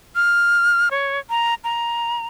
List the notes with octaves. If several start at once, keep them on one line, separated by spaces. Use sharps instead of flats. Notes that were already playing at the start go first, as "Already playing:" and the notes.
F6
C#5
A#5
A#5